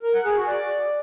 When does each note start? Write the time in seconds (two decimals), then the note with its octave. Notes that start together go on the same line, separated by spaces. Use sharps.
0.03 A#4
0.14 F#5
0.25 G#4
0.37 F#4
0.48 D5